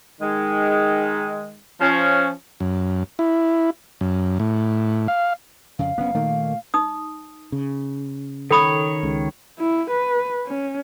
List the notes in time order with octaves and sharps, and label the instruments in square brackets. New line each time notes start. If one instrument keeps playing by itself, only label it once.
[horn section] D#3 G#3
F3 C#4
[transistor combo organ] F#2
E4
F#2
A2
F5
[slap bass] F2 C#3 [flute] F5
[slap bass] F#1 C#4 [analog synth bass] B3
[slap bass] A#2 A3 A#3 [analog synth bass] D#3
[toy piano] D#4 D#6
[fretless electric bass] C#3
[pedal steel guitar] D#3 C#5 [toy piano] A4 B5 D#6
[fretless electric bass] C#2 C#3
[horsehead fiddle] E4
B4
C#4